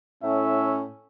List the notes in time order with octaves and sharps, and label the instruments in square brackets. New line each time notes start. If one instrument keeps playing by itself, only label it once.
[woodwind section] A2 [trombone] C#4 [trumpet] E5